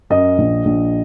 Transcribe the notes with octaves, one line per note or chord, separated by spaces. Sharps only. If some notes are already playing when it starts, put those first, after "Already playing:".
F#2 D#5
A#1
A#1